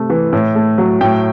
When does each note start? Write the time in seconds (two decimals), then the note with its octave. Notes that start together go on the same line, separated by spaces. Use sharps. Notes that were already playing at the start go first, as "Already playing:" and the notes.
Already playing: C3 A3
0.10 E3
0.33 A2
0.55 A3
0.78 F#3
1.01 A2 G5